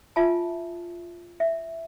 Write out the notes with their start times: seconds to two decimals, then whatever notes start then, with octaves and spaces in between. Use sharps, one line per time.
0.16 F4 E5 G#5 A5
1.40 E5